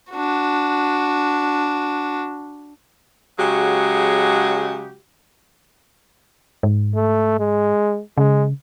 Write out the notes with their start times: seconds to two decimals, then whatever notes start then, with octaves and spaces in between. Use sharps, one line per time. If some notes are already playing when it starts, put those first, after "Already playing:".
0.12 D4 F#4
3.38 C#3 F#3 G#3 F#4 G4
6.63 G#2
6.95 A3
7.40 G#3
8.17 C#3 G#3